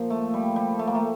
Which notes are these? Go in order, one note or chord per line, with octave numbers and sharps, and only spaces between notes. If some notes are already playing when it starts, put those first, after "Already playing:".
Already playing: A#2 F3
A3
G3
G3
A3
A#3
A3